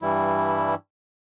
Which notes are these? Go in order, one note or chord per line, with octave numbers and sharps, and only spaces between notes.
G2 E3 G3 E4